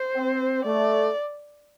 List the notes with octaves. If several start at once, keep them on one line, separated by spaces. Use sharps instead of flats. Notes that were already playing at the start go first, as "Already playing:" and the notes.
Already playing: C5
C4
A3 D5